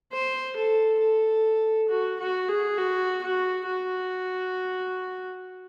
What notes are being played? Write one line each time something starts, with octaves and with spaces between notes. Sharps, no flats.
C5
A4
A4
F#4
F#4
G#4
F#4
F#4
F#4